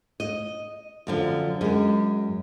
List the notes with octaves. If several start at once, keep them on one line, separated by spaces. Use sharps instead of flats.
D#5
F#2 D3 F3
F#2 G#3